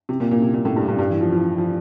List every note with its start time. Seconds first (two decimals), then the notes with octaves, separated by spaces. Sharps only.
0.09 C3
0.20 A#2
0.31 A#2
0.42 C3
0.54 A#2
0.65 A2
0.76 G2
0.88 G2
0.99 G2
1.10 E3
1.21 F3
1.32 F3
1.58 F3